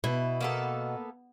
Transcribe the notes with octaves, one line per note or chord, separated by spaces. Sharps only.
B2 E4
A#3 B3 A4